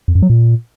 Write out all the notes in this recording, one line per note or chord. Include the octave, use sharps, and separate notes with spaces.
F2
F#2
F#3
A#2